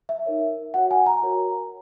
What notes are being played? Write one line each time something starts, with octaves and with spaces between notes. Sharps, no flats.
E5
D#4 A#4 C#5
F#4 C#5 F#5
G#5
A#5
F#4 A#4 C#5